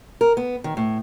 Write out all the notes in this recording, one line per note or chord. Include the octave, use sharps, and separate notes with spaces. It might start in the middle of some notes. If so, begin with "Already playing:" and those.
A#4
B3
D#3
A2